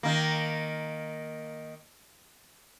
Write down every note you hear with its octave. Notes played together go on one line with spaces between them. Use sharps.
D#3 A#3